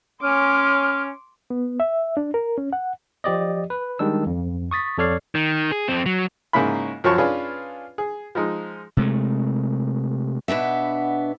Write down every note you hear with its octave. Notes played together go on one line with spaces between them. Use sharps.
C#4 C6 D6 F6
B3
E5
D4
A#4
C#4
F#5
F3 G4 D5 D#5
B4
D#3 G3 G#3 D4 E6
F2
C#6 D#6 A6 B6
F2 A4 C#5 D5 F6 C7
D#3
G#4
F2 C4
F#3
G#2 C#3 A#3 C#4 E4 B5
F#2 F3 F#3 C#5 A5
C#4 D4 F4 G#4 B4
G#4
F3 G#3 D#4
C3 G#3 A3
B2 B3 D4 E5